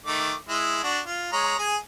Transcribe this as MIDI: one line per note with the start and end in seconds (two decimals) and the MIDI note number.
0.06 0.33 51
0.06 0.33 57
0.06 0.33 86
0.49 0.78 56
0.49 0.78 64
0.83 0.99 62
0.83 0.99 66
1.06 1.29 65
1.32 1.55 56
1.32 1.55 73
1.32 1.55 82
1.59 1.76 68
1.59 1.76 80